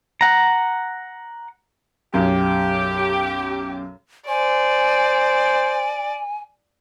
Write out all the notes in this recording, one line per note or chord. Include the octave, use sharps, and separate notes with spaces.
F#5 A#5
B1 F#2 G4
C5 D5 G#5